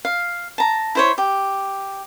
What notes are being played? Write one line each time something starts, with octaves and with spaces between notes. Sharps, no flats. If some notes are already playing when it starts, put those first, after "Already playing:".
F5
A5 A#5
E4 C5 C#5
G4